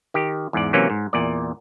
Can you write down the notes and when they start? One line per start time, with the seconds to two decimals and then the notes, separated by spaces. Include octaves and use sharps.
0.14 D#3 G4
0.53 E2 G#2 D5
0.73 C3 E3 F#3 A#3 C#4
0.90 G#2
1.13 E2 A#2 D5